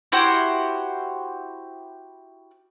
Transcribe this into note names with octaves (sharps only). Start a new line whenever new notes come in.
E4 F#4 G4 C5